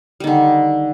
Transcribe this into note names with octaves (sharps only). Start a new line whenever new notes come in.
D3 D#3 G3